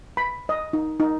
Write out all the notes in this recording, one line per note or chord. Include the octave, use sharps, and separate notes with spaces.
B5
D#5
D#4
D#4